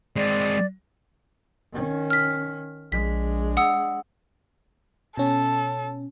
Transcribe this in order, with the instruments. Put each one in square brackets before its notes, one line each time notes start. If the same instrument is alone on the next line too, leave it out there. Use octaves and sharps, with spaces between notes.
[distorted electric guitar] G#3 C4 [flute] D5
[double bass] D#3 C#4
[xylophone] F6 B6
[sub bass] A#1 [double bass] G#3 D4 [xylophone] B6
[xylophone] F#5 D#6 E6
[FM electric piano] B2 C#4 [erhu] A4